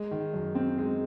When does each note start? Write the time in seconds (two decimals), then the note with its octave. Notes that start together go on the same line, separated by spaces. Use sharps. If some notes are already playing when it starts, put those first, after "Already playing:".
Already playing: G#3
0.11 D#3
0.33 F#2
0.55 C4
0.78 G#3